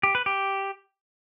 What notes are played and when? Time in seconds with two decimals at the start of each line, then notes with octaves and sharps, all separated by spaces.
0.03 G4
0.15 B4
0.26 G4